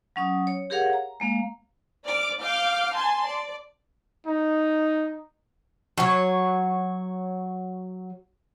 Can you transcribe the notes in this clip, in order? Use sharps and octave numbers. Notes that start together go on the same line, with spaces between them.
F#3 C#4 D#6
C#5
G4 G#4 A#4 C#5 F5 F#5
A#5
G#3 A#3 F5
D5 D6 F6
F5 D6 F6 G6
G#5 A5 C6
D5
D#4
F#3 C#5